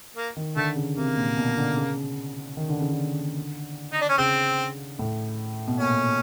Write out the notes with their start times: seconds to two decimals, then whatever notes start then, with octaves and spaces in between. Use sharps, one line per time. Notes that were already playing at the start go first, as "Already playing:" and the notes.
0.16 A#3
0.37 D#3
0.56 D3 A3
0.76 C#3
0.96 C3 A#3
1.17 A#2
1.37 B2
1.57 D3
1.77 C#3
2.57 D#3
2.69 D3
2.81 C#3
2.92 D3
3.93 D#4
4.01 D4
4.09 C#4
4.18 C#3 C4
4.99 A2
5.68 B2
5.79 A#2 C#4